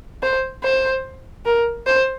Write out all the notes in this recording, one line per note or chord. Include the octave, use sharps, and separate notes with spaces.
C5
C5
A#4
C5